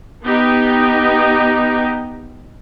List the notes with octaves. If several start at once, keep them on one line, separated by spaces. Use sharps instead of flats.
B3 D#4 G4